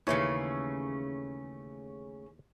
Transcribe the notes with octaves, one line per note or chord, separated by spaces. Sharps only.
D#2 C#3 E3 A3 C#4 C#5